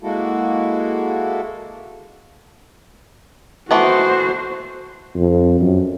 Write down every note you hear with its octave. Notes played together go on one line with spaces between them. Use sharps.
G#3 A#3 E4 F#4 A4
E3 A3 B3 F#4 C5
F2
F#2